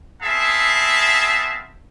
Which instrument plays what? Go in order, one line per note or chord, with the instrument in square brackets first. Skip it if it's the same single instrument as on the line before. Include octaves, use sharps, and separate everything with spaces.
[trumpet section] B3 C4 G#4 E5 F5 A5